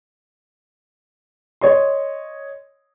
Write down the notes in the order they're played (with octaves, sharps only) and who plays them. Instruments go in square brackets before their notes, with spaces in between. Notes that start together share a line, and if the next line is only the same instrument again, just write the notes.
[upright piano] C#5 D#5 C6